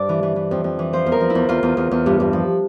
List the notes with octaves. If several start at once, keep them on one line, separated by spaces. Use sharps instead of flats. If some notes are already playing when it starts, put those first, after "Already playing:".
Already playing: G2 C5 D5
E3
E3
E3
F2
F2
E3
F3 C5
E2
A#4
F3
E4
E2
E2 F4
E2
E2
E2
G2
G2
F3